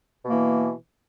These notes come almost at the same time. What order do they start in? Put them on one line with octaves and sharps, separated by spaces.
B2 A#3 E3